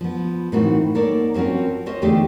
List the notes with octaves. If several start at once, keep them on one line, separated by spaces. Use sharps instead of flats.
F3 B3
A2 D#3 E3 C4 F#4
G#2 A#3 A4 C#5 D5
F3 C4 C#4 F#4 A#4
F4 C5 C#5 D#5 E5
E2 G#2 D3 A3 G4 G#4